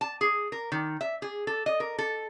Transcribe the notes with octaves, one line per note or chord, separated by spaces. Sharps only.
A5
G#4
A#4
D#3
E5
G#4
A4
D#5
A#4
A4